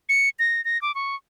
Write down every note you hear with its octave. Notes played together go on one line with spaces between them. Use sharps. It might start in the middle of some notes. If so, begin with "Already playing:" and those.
C#7
A#6
A#6
D6
C#6